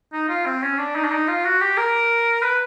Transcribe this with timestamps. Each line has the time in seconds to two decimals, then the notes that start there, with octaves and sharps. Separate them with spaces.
0.13 D#4
0.29 F4
0.46 C4
0.62 C#4
0.79 D4
0.96 D#4
1.05 D4
1.11 D#4
1.28 F4
1.45 F#4
1.61 G4
1.78 A#4
2.43 B4